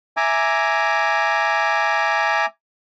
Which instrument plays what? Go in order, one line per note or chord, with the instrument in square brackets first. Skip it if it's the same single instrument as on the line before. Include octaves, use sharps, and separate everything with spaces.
[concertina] E5 G#5 A#5 D6